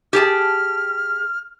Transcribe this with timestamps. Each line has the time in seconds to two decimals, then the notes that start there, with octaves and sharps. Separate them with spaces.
0.13 G4 G#4 A5 F6